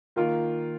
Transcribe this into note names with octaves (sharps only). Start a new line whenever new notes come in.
D#3 A#3 F4 A#4